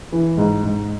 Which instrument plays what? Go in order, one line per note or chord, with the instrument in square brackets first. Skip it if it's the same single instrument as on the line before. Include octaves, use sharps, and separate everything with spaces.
[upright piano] E3
G#2
G#2